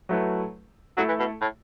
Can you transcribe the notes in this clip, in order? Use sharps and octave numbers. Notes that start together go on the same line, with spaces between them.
F#3 A3 E4 B4
F#3 A3 E4 A4
E3
B2
A2